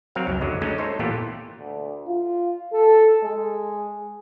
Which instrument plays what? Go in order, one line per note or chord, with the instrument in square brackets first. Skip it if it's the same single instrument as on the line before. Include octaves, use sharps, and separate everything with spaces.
[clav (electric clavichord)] F#3 C4 A#4 F5
C#2 F#2
F#2 D3 F#3 G#3
G#3 A3 C#4 D#4
D#4 A4 C5 C#5
A#2 E3 A3 B3 F4 G4
[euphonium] D2
F4
A4
G#3